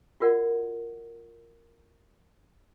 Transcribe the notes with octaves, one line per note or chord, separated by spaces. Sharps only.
F4 F#4 A#4 D5 F#5